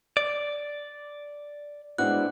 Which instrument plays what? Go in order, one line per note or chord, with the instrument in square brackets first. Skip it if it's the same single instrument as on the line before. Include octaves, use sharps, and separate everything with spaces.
[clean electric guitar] D5
[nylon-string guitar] G#3 C4 F#4 [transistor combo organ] B3 D4 E4 [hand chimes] F#6